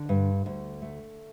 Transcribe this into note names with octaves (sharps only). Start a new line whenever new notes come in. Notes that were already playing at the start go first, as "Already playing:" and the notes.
Already playing: D3
G2
D2
A3